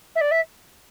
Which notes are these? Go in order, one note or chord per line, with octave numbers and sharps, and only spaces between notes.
E5
D5
E5